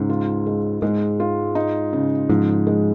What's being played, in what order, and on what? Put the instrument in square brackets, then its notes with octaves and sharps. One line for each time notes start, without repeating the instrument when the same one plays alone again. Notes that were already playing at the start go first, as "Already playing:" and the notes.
Already playing: [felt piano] C#2 C#3 [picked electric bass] G#2
[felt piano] F4
G#3
[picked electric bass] G#2 [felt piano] G#3
[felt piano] F4
D#4
C#3
[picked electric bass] G#2 [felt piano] F3
[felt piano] G#3